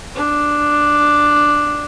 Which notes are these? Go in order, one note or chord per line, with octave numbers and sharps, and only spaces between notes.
D4